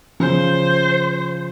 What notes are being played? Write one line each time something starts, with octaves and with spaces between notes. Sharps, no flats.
C#3 F3 C5